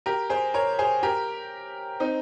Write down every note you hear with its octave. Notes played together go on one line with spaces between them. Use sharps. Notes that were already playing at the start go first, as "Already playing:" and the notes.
G4 A#4
G#4 C5
A#4 C#5
G#4 C5
G4 A#4
C4 D#4